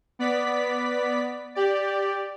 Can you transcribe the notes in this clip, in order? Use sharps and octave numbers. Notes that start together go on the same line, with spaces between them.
B3 D5 B6
G4 D5